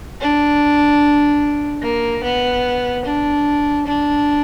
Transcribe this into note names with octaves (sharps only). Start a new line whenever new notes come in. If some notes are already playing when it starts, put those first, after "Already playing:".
D4
A#3
B3
D4
D4